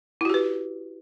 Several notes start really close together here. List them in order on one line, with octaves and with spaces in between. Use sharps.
E4 F#4 G4 B4